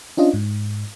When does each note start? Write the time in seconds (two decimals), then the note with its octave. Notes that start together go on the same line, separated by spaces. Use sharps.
0.17 C#4 D4 F4 D#5
0.34 G#2